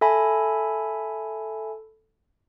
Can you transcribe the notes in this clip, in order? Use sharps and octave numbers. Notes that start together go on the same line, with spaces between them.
A4 E5 G#5 B5